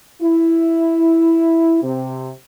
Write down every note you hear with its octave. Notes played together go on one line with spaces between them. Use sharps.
E4
C3